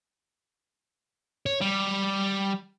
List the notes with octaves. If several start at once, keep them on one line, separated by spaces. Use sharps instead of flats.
C#5
G3